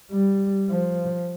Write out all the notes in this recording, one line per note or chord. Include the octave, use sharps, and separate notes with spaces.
G3
F3